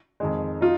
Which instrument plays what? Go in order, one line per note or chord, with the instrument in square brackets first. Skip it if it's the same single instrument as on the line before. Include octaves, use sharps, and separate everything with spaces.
[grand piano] F2 D#3 G#3
[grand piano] D#4 [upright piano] F4